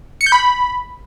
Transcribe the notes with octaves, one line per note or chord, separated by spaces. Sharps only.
C#7
G6
B5